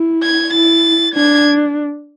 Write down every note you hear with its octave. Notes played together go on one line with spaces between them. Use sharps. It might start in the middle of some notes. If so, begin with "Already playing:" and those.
Already playing: E4
G#6
E4 A6
D4 G#6